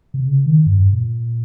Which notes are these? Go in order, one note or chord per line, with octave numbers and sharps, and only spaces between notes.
C3
C#3
D#3
G2
G2
A#2